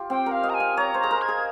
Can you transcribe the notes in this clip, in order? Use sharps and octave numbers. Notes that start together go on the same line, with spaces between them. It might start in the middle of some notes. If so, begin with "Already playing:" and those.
Already playing: F4 G4
C4 G5
A#4
F5
D#5
A#5
G#5
F5
C#5 A#5
C5
G#4 A#5
A#4
G#6
G#4